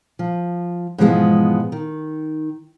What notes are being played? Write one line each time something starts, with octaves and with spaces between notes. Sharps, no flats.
F3
G#2 B2 E3 F3 G#3 B3
D#3